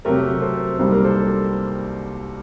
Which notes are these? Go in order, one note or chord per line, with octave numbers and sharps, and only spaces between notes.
C3 F#3 A3 C4 G4 A#4
A4 C5
C2 C3 G3 A#3 D#4 C5
A#4
A4 C5